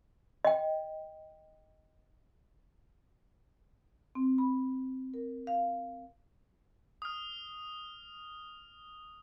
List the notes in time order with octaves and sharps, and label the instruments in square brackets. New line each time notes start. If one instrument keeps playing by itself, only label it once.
[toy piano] D#5 G5
[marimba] C4
B5
A#4
F5
[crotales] D#6 F6